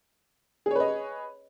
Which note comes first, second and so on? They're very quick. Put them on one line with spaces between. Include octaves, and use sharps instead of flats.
G#4 C#5 B4 D#5